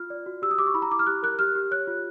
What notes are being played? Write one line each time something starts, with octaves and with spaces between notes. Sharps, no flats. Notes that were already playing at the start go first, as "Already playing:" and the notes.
Already playing: F4 F6
D5
F#4
G4 E6
D#6
G4 D6
C#6
E4 B5
A#5
E4 D6
F6
G4 F#6
A#4 F#6
G4 F6
G4
C#5 F#6
F4